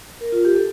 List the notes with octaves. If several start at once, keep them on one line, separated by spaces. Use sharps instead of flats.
A#4
F4
G4
A4